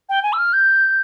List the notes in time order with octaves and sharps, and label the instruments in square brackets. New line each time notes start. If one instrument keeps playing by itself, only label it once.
[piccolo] G5
G#5
E6
F6
G6